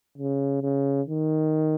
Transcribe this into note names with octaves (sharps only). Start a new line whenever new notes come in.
C#3
C#3
D#3